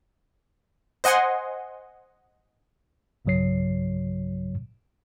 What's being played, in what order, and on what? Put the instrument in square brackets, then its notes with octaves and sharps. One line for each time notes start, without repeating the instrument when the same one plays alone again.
[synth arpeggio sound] C5 D#5 F#5 G#5 C6
[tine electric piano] B1 G2 C#3 F#3 C#5 C7